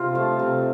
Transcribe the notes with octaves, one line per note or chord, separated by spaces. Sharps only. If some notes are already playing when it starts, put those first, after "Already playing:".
Already playing: C3 F4
F3 A3
C3